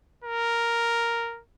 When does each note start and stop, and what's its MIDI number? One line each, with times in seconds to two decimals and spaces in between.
0.24 1.41 70